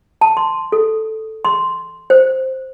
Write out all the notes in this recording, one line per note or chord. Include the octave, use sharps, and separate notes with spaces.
A5
C6
A4
C6
C5